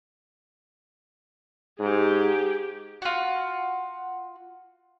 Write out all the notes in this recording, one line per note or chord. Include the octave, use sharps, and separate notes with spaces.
G#2 G4 G#4
F4 F#4